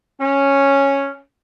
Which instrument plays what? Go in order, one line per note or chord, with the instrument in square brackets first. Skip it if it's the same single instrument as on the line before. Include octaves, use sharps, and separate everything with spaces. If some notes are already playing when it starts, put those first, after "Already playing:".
[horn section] C#4